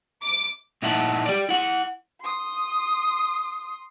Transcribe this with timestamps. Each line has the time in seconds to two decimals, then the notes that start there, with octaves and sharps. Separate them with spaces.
0.22 D6
0.82 A#2 D#4 E4 E5 F#5 A5
1.26 G4 D5
1.49 E4 F#5
2.21 C6 D#6